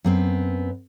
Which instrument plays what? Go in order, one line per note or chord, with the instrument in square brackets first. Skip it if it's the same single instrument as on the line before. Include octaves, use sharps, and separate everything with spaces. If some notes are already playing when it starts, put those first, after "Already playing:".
[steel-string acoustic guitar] F#2 B3 C4